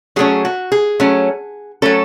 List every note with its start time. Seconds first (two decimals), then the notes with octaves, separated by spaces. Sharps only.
0.16 F#3 A3 C#4 G#4
0.45 F#4
0.72 G#4
1.00 F#3 A3 C#4
1.82 F#3 A3 C#4 A4